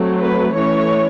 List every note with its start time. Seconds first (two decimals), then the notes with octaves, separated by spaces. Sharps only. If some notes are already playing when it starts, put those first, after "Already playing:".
Already playing: F#3 A3 C4
0.20 B4
0.54 E3 A3 C#4 C#5